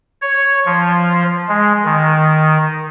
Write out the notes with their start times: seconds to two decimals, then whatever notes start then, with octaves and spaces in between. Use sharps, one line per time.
0.22 C#5
0.66 F3
1.49 G#3
1.85 D#3